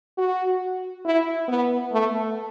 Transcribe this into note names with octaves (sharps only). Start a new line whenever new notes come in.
F#4
E4
B3
A3